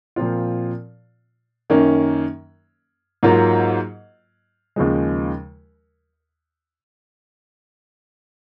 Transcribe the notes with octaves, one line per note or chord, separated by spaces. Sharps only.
A#2 F3 C4 F4
F#2 D#3 A#3 C#4
G#2 F#3 A#3 F4
D#2 C#3 F3 G#3